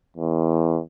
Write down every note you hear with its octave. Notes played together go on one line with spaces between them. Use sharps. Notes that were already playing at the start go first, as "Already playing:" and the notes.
E2